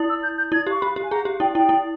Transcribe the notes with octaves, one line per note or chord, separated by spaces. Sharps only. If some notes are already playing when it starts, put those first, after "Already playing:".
Already playing: E4
E6
G6
G6
E4 G#6
G4
C#6
G4 B5
G4
G#5
G#4 A#5
G4
E4 G5
E4 G5
E4